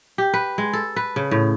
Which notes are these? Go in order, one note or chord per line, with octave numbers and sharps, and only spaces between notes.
G4
B4
G#3
A4
B4
C#3
A2